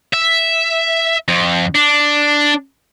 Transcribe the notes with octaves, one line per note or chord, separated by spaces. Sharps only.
E5
F2
D4